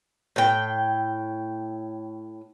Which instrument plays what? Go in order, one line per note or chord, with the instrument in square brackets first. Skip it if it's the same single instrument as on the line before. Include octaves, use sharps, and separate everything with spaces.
[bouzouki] A2 G5